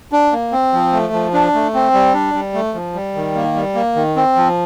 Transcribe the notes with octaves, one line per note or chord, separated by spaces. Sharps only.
D4
A#3
C4
F3
A3
F3
D4
A3
C4
G3
D4
G3
A3
F3
G3
D#3
A#3
G3
A#3
D#3
C4
F3